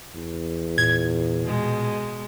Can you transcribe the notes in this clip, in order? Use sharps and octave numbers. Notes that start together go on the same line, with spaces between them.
E2
A#2 G#6
B2 G#3